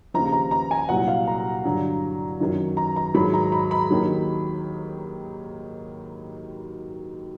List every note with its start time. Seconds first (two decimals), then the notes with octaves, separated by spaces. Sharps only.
0.14 D#2 C#3 F3 A#5
0.32 A#5
0.51 A#5
0.71 G#5
0.89 C2 A#2 F#3 F#5
1.08 F5
1.27 A#5
1.64 G2 D3 F#3
2.40 F#2 D#3 F#3
2.77 A#5
2.96 A#5
3.14 G#2 D#3 F#3 B5
3.34 A#5
3.52 B5
3.71 B5
3.91 D#2 D#3 F#3